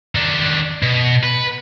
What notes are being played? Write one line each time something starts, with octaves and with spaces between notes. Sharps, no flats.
D#3 D4
B2
B4